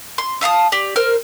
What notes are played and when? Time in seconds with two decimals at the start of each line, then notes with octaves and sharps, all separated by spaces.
0.18 C6
0.41 E5 F5 A5 D#6
0.72 G4 D5
0.96 A#4 C5 F6